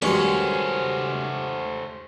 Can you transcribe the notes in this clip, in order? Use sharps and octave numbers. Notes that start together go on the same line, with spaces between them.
G2 C3 D#3 F#3 G#3 A3 C#4 C5